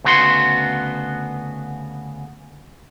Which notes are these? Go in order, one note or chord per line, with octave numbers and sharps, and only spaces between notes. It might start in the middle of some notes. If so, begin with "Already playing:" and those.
D2 C#3 B3 F#4 C6